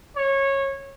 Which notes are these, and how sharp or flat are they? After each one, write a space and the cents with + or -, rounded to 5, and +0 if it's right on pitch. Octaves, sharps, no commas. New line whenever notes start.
C#5 -20